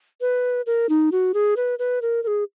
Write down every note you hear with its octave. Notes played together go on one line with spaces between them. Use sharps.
B4
A#4
D#4
F#4
G#4
B4
B4
A#4
A#4
G#4